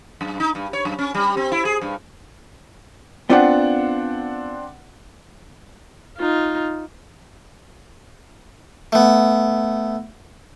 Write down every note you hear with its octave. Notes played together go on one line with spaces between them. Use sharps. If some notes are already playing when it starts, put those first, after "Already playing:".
F#2
D#4
G2
C#5
F#2
C#4
G3
C4
E4
G#4
G2
B3 C4 D4 F4 C5 F#5
D#4 F4
A3 B3